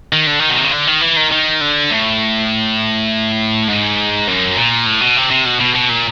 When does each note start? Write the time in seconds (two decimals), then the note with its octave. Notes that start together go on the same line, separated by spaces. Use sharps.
0.13 D#3
0.27 D3
0.39 D#3
0.49 B2
0.57 C3
0.64 C#3
0.71 D3
0.87 D#3
1.01 E3
1.16 D#3
1.31 D#3
1.61 D3
1.91 A2
3.68 G#2
4.28 F#2
4.57 A#2
4.86 A2
5.01 B2
5.17 C3
5.30 C3
5.46 B2
5.60 B2
5.75 B2
5.90 A#2